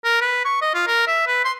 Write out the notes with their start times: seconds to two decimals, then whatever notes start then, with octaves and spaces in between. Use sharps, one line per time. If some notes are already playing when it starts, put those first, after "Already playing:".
0.04 A#4
0.21 B4
0.45 C#6
0.62 D#5
0.74 F4
0.87 A#4
1.07 E5
1.27 B4
1.45 C6